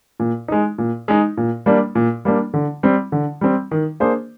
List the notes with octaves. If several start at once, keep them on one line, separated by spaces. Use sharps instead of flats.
A#2
G#3 D#4
A#2
G#3 D#4
A#2
G3 A#3 D4
A#2
G3 A#3 D4
D3
G3 C4
D3
G3 C4
D#3
A#3 D4 G#4 C5